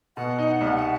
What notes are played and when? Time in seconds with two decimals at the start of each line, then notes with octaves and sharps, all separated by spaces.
0.17 B2 F#5
0.38 D#4
0.61 C2